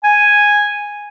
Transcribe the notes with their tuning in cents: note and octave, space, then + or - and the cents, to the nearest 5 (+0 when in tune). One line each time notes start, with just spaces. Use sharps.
G#5 -5